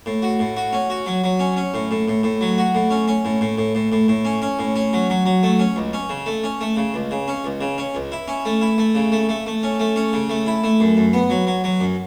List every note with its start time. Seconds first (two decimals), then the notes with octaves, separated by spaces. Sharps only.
0.06 A2
0.22 F#4
0.40 A2
0.57 F#4
0.73 C#4
0.90 F#4
1.06 F#3
1.24 F#3
1.39 C#4
1.56 C#4
1.74 A2
1.91 A2
2.08 A2
2.23 A2
2.41 F#3
2.58 F#4
2.75 A2
2.91 C#4
3.08 C#4
3.25 A2
3.41 A2
3.58 A2
3.75 A2
3.92 A2
4.08 A2
4.25 C#4
4.42 C#4
4.59 A2
4.76 C#4
4.93 F#3
5.10 F#3
5.26 F#3
5.43 A3
5.59 C#4
5.76 C#2
5.93 C#4
6.09 C#3
6.26 A3
6.44 C#4
6.61 A3
6.77 C#3
6.94 C#2
7.11 C#3
7.28 C#4
7.44 C#2
7.61 C#3
7.78 C#4
7.95 C#2
8.12 E4
8.28 C#4
8.45 A3
8.61 E4
8.78 A3
8.95 C#3
9.12 A3
9.29 A3
9.46 A3
9.63 C#4
9.80 A3
9.96 C#4
10.13 C#3
10.30 A3
10.46 E4
10.64 A3
10.80 F#2
10.97 F#2
11.13 B3
11.30 F#3
11.47 F#3
11.64 F#3
11.80 F#2